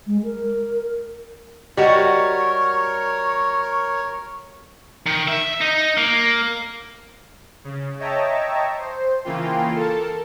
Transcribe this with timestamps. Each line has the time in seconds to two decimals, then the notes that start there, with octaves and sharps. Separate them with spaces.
0.07 G#3
0.24 A#4
1.77 G3 F#4 G4 A#4 C#5 D#5 F#5 C#6
5.06 D#3
5.28 E5
5.61 D#4
5.98 A#3
7.64 C#3
7.99 C#5 D#5 E5 G5 A5 A#5
8.78 C5
9.24 C#3 E3 A#3 F4 G5 C6
9.75 A4 A#4 A5